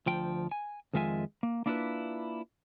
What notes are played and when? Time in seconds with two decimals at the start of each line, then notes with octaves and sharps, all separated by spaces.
0.06 D2 F3 G5
0.51 G#5
0.93 F2 D#3 G#3 F4 E5 G#5
1.43 A#3
1.66 A#3 D4 E4 F4 A4 B4